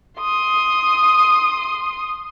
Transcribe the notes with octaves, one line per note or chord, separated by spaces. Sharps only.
C6 D#6